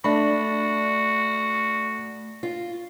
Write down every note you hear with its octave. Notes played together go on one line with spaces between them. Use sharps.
A3 D4 F#4 B5
F4